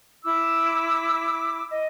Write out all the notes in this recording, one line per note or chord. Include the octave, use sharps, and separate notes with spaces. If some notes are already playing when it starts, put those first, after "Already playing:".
E4 D6 E6
D#5